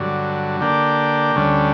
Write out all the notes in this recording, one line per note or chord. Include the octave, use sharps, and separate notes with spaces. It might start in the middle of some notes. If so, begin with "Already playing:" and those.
Already playing: G2 D3 F#3
D3 A#3 D4 G4
D2 D3 G3 C#4